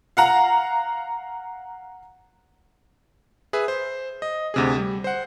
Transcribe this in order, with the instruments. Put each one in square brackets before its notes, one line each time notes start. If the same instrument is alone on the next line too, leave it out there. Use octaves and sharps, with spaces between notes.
[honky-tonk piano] F5 F#5 A#5
[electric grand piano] G#4 B4 E5
C5
D#5
D2 C3 G#4
G3
C5 F#5